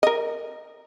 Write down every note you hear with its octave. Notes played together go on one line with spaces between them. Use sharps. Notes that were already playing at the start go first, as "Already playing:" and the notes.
A#4 D#5